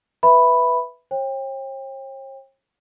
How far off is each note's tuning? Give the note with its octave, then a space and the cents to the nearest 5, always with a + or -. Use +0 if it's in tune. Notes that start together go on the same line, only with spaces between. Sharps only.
B4 +0 E5 +0 B5 +0
C#5 -45 G5 +25